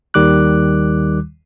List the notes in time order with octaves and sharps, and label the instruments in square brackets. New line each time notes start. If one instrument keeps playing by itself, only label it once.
[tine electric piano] D#2 D#3 G3 D6 F#6